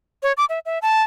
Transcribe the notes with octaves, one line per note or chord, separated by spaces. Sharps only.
C#5
D6
E5
E5
A5